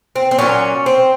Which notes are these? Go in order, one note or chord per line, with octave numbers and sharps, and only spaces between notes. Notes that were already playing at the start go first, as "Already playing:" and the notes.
C4
C4
A#2 F#3 C#4
C4